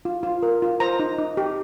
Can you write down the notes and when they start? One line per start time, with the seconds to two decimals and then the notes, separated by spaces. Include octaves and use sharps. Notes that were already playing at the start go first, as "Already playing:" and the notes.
0.05 F4
0.23 F4
0.43 A#4
0.62 F4
0.80 C5 A#5
0.99 D#4
1.18 D#4
1.37 G4